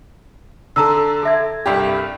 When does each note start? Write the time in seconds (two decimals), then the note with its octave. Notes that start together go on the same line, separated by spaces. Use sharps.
0.76 D3 A4 A5 A#5 E6
1.23 A4 E5 G#6
1.66 C2 G2 G4